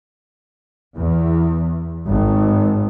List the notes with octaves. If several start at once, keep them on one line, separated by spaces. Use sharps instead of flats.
E2
G#1